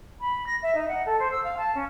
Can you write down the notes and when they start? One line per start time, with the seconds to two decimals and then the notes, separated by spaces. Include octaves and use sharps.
0.21 B5
0.47 A#6
0.62 E5
0.75 D#4
0.88 F#5
1.06 A4
1.19 C5
1.31 E6
1.44 F5
1.58 A5
1.75 C#4